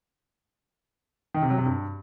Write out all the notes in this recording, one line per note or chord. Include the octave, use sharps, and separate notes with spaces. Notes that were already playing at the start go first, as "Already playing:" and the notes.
D#3
C3
F#3
C3
G2